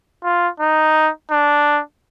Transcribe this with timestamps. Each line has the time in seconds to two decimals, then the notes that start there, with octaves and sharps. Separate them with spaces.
0.24 F4
0.60 D#4
1.31 D4